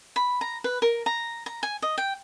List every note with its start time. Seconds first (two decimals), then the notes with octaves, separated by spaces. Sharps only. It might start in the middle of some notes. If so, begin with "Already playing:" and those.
0.16 B5
0.41 A#5
0.64 B4
0.82 A#4
1.06 A#5
1.46 A#5
1.63 G#5
1.82 D#5
1.98 G5